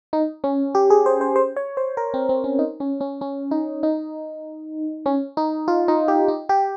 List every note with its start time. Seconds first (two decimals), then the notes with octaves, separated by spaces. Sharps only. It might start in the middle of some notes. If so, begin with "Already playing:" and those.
0.13 D#4
0.44 C#4
0.75 G4
0.90 G#4
1.06 C5
1.21 C5
1.36 C5
1.56 C#5
1.77 C5
1.97 A#4
2.14 C4
2.29 C4
2.44 C#4
2.59 D#4
2.80 C#4
3.01 C#4
3.21 C#4
3.51 D#4
3.83 D#4
5.06 C#4
5.37 D#4
5.68 F4
5.88 D#4
6.08 G4
6.28 D#4
6.49 G4